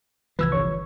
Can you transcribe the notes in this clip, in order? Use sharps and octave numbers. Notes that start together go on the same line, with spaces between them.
C2 E3 F3 B4 E6 G#6
G1 C#5 C#6